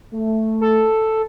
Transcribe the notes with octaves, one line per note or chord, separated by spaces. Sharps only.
A3
A4